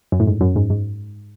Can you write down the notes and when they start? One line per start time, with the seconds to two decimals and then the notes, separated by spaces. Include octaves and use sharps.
0.12 F#2
0.20 A2
0.27 G#2
0.41 F#2
0.56 G#2
0.70 G#2